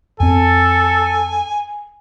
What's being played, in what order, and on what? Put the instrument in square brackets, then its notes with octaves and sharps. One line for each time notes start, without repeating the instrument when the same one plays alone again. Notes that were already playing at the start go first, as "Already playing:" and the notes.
[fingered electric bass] F2 C4 [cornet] A4 [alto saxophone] G#5